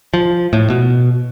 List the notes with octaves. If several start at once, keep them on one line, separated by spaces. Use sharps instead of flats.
F3
A2
B2